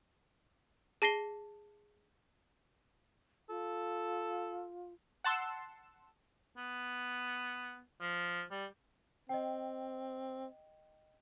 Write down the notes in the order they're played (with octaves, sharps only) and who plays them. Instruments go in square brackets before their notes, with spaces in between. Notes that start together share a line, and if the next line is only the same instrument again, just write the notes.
[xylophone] G#4 A5 A#6 C7 G7
[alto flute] F4 [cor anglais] A4
[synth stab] F#5 A5 C6 E6
[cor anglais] B3
F3
G3
[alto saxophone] C4 [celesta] D#5 G5